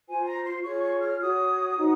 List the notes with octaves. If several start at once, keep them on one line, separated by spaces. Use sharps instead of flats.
F4 C5 G#5
A#5
C6
F4 G#4 C#5 C#6
C#6
F6
F#4 C#5 D#6
D#4 F#4 C5